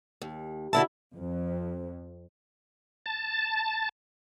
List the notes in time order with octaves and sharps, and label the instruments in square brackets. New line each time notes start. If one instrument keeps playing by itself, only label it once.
[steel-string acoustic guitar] D#2
[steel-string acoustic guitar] B2 D3 A5 [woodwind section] E4
[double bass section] F2
[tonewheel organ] A5